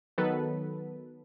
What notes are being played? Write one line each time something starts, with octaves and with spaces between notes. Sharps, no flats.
D#3 F#3 B3 A4 B4